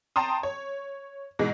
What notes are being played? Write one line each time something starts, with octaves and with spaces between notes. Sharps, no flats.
G5 A5 A#5 C6 D#6
C#5
G#2 B2 E3 G#3